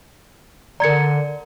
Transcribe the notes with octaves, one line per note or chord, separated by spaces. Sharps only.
D3 A#4 D5 A#5 G#6 C#7